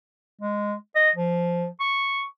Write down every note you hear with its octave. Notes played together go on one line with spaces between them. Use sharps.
G#3
D#5
F3
C#6